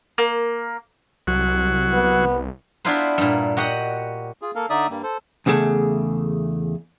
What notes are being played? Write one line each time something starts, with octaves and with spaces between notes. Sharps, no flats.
A#3
C2 F#3 F#4
B3
B3 D4 E4 F4 B4 C5
G2 A#2
F#4 G4 D#5 F#5
F4 G#4
A#3 A4 A#4 F5
D3 D#4 D5 E5 D#6
G2 G3 A#3
A4 C5
E2 C#3 A3 G#4 A5